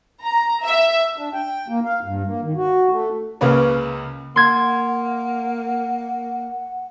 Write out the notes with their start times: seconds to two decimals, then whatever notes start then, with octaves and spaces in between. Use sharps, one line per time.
0.24 A#5
0.64 E5
1.17 D4
1.34 G5
1.68 A#3
1.84 F5
2.04 G2
2.27 A#3
2.43 D#3
2.56 F#4
2.91 A3
3.41 C#2 C#3 A#3 B4 C#5
4.36 A#3 F#5 C6 G#6